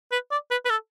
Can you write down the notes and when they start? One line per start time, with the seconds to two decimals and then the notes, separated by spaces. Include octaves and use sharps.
0.12 B4
0.31 D5
0.50 B4
0.65 B4
0.70 A4